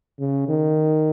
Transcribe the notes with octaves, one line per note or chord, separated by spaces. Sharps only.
C#3
D#3